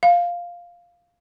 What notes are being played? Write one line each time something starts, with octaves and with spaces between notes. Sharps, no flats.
F5